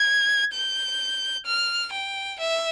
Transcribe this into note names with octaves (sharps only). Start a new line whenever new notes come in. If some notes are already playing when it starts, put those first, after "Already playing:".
Already playing: G#6
G6
F6
G5
E5